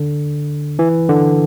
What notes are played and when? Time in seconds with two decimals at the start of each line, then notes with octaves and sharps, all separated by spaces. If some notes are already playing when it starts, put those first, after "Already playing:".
Already playing: D3
0.79 E3
1.09 D3